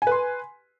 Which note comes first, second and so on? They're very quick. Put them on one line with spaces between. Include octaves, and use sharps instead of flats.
G#5 B4 C6